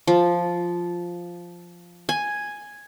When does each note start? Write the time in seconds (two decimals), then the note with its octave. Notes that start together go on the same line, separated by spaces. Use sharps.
0.07 F3
2.09 G#5